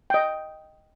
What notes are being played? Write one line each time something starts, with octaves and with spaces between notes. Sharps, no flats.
D#5 G5